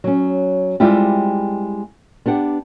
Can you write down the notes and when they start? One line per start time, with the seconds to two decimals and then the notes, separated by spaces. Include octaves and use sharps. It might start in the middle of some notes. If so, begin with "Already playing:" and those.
0.04 F#3 C#4
0.80 G3 G#3 C4 E4 F4 G4
2.26 B3 D4 G4 F#5